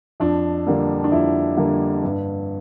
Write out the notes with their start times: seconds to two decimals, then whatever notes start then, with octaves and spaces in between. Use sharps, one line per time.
0.20 F2 D4
0.67 D3 G3 A#3
1.04 D4
1.12 F2 E4
1.57 D3 G3 A#3
2.03 G2